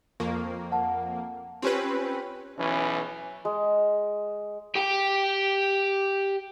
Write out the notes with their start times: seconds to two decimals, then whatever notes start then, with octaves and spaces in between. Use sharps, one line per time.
0.20 F2 A#3 C#6
0.72 F#5 A5
1.62 C4 C#4 F4 G4 B4
2.58 B1 E3 C#4
3.45 G#3
4.75 G4 G5